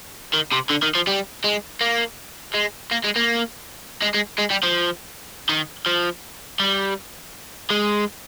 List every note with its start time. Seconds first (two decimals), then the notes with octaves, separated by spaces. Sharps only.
0.33 D#3
0.52 C3
0.69 D3
0.82 D#3
0.95 F3
1.07 G3
1.44 G#3
1.81 A#3
2.54 G#3
2.91 A#3
3.04 G#3
3.16 A#3
4.02 G#3
4.14 G#3
4.39 G#3
4.51 G3
4.63 F3
5.49 D#3
5.86 F3
6.60 G3
7.70 G#3